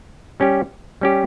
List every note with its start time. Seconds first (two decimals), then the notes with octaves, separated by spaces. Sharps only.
0.40 G3 C#4 G4
1.01 G3 C#4 G4